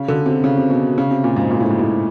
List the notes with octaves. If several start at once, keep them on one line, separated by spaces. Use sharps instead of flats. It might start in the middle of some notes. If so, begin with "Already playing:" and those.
Already playing: C#3
D3
C3
C#3
C3
B2
C#3
C3
A#2
G#2
A#2
A2
G#2
A2